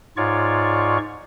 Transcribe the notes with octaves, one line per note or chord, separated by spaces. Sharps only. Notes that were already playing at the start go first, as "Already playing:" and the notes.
G#2 F4 C#5 D5 C#6